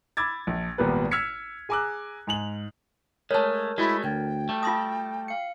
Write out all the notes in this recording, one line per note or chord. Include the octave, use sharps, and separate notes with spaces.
B5 D6 E6 G#6 A6
A#1
G#1 A#2 G3 B3 A#4 B4
E6 F6 G#6 B6 C#7
G#4 G#5 A#5 D6 E6 F#6
G#2 G#5 F7 F#7
G#3 A3 A#4 C#5 A5
G#3 A3 E4 F#4
D2 G5
G3 A3
F4 A5 C6 D#6 A#6
F5 C#7